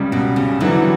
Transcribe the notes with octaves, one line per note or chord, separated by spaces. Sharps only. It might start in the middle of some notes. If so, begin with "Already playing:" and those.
Already playing: C#2 C#3 G3
B2
C#3
D3 E3 F#3 G3 B3 E4